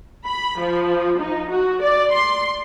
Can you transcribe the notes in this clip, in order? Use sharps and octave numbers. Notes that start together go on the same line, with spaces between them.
B5
F3
D#4
F#4
D5
C6